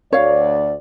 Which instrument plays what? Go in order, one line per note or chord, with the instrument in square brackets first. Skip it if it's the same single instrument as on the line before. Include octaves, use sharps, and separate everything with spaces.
[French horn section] D2 D5 [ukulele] C#5 F5